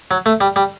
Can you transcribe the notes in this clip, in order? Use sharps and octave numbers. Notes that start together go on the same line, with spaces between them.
F#3
A3
G3
G3